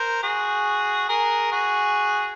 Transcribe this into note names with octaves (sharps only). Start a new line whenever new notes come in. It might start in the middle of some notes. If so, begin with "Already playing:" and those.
Already playing: A#4 C5
F#4 G#4
G#4 A#4
F#4 G#4